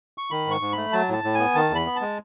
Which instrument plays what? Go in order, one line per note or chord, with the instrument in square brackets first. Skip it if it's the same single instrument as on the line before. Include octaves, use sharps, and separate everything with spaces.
[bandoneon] C#6
D#3 B5
G#2 C#6
G#2
A3 B5
F#3 A5
A2 A5
A2
B3 G#5
D#3 A5
E2
B5
B3
G#3 A5